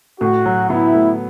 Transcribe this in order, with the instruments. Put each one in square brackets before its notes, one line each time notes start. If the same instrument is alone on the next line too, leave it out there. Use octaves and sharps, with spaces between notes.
[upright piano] A2 [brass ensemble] F#4
[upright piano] F#3
[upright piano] B3 [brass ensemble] E4
[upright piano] A2